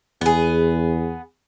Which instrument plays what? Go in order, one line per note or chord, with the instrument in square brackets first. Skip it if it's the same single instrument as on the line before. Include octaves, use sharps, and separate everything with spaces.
[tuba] E2 [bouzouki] B3 G#4